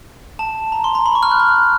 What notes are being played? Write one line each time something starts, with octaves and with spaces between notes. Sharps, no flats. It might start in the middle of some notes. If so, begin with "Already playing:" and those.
A5
A#5
C6
A#5
B5
C#6
F6
F#6
F6